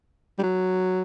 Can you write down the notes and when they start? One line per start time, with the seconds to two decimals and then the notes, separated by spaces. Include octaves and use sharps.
0.39 G3
0.43 F#3